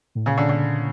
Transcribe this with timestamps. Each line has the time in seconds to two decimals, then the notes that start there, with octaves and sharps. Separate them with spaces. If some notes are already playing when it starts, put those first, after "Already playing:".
0.15 A2
0.25 A#2 C#3
0.38 D3
0.49 D3